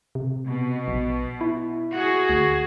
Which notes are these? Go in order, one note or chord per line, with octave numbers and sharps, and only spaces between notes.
C3
B2
A#1
E4
F#4 G#4
D2